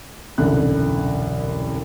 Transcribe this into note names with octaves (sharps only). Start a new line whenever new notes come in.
E1 C2 F#2 D3 F#6